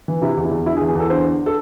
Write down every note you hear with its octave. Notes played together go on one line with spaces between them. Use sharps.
E3
C3 E4
E2
E4
E2
D3 E4
G#4
E2
G#4
E2 A4
D3 C5
D3
A4